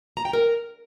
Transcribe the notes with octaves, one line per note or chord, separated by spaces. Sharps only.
A#5
G5
A#4